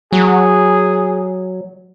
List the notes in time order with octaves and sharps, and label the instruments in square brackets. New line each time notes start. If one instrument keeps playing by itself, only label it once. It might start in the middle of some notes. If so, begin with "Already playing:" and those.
[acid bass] F#3 [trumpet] G#4